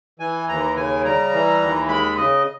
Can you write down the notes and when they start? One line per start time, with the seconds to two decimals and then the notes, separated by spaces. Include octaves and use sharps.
0.19 E3 G#5
0.49 D#2 A#5
0.76 C#3 G#5
1.05 G3 A#5
1.33 E3
1.61 D#2
1.89 G#3 B5
2.17 C#3 D#5